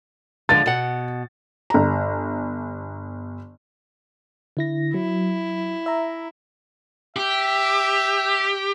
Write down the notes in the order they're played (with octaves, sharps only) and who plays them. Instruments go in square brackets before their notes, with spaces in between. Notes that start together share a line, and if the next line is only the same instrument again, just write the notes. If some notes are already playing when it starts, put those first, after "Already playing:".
[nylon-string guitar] D3 F3 G#3 [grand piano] A6
[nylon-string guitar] B2 F#5
[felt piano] G1 A#5
[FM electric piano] D3 E4 A#6
[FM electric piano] F#3 [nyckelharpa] E4
[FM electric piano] E5 A#5
[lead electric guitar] G4 [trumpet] E5